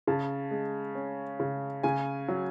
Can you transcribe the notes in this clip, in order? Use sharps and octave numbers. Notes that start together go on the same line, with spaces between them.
C#3 A5
G#3
C#4
C#3
C#3 G#5
F#3